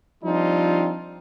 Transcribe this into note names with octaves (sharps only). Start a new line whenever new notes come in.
F3 G3 C4 D4 D#4 F4